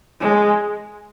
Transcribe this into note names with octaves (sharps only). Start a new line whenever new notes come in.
G#3